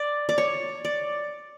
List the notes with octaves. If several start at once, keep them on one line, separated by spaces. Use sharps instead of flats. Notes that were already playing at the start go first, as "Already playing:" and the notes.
Already playing: D5
D5
C#5
D5